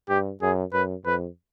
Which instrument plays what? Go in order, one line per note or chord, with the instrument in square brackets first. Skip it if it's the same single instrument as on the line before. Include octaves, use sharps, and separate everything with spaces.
[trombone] G2 [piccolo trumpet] G4
[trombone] F#2 [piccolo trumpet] G#4
[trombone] F#2 [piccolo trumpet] B4
[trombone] F2 [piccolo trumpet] B4